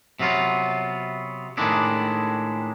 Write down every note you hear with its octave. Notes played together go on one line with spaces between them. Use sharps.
C3 F#3 B3 F4
A2 D#3 G#3 D4 E4